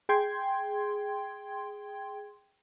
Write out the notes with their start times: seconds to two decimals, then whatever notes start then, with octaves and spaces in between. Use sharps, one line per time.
0.09 G#4 G5 C6 G#6